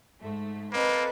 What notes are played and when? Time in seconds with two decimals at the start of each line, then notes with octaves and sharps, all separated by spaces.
0.20 G#2 A3
0.73 A#3 C4 A4 B4 C5 D#5